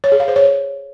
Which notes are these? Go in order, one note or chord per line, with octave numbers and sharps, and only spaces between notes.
C#5
G#4
F5
C5
C#5